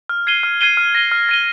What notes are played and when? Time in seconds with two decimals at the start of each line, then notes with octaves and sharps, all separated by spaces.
0.09 F6
0.27 G#6 C7 D#7 G7
0.43 F6
0.61 G#6 C7 D#7 G7
0.77 F6
0.95 A#6 D#7 G7
1.12 F6
1.29 A#6 D#7 G7